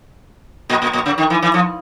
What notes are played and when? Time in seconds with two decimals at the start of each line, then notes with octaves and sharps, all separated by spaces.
0.70 A#2
0.82 A#2
0.93 A#2
1.06 C#3
1.18 D#3
1.30 E3
1.42 E3
1.54 F3